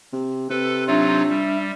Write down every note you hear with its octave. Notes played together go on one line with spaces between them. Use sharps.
C3
C3 A4 B4
F#3 D4 D#4 F4 E5
G3